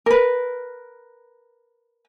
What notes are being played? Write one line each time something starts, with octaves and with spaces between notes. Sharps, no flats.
A#4 B4